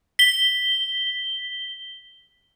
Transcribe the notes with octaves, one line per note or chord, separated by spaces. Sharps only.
B6 G7